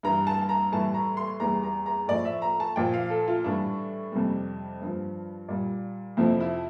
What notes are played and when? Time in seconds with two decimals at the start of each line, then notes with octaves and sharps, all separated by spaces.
0.03 G2 E3 G3 A#5
0.27 A5
0.41 A5
0.49 A#5
0.72 A2 E3 G3 A5
0.94 A#5
1.17 C6
1.40 E2 E3 G3 A#5
1.63 A#5
1.86 A#5
2.08 A2 F3 D5
2.25 E5
2.42 A#5
2.60 A5
2.76 A#2 F3 G5
2.94 F5
3.10 A4
3.28 F4
3.44 A2 E3 G3 D4
4.12 F2 C3 G3
4.81 G2 F3
5.48 A#2 G3
6.17 F2 C3 F3 E4
6.40 E4